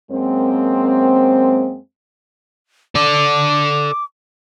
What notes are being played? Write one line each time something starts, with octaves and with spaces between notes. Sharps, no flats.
F#2 G#3 A#3 C4
A4 D5 D6